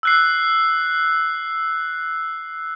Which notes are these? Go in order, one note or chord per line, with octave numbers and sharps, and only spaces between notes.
E6 F#6 C7